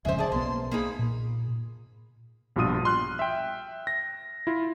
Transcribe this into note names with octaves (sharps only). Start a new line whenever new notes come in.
D1 F2 C#3 G#3 C5 E5
G#4 D5 A5
B1 A#3 B3 C6
A#3 D#4 G#4 B5
A#2
A#1 G2 B2 F4 D#6 D#7
C6 F6 F#6
E5 G5
A#6
E4 F4